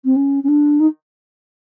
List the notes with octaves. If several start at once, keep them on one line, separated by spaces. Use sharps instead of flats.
C4
C#4
C#4
D4
D#4